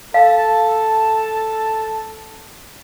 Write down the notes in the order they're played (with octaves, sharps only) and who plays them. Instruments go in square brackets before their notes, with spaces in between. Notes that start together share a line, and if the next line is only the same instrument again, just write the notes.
[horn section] A4 A5 [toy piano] F5